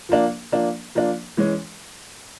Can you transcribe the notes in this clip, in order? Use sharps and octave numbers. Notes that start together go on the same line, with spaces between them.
F3 A#3 D4
F3 A#3 D4
F3 A#3 D4
E3 G#3 C#4